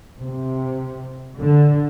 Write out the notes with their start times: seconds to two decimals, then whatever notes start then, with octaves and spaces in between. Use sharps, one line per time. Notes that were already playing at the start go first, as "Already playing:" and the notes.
0.22 C3
1.38 D3